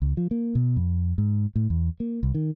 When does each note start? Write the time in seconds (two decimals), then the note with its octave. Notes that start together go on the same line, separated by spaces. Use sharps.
0.02 C#2
0.17 F3
0.31 A#3
0.55 B2
0.76 F2
1.18 G#2
1.56 A2
1.70 E2
2.00 A#3
2.23 C2
2.35 D#3